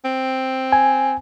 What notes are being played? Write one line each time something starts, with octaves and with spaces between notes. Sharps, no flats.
C4
G#5